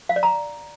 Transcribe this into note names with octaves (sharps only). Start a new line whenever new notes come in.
F5
D5
A#5